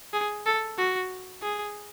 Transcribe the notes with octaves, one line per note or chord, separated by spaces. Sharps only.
G#4
A4
F#4
G#4